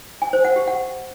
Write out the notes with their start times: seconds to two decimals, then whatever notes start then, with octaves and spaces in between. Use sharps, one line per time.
0.22 G#5
0.33 C5
0.45 F#5
0.56 G4
0.67 F#5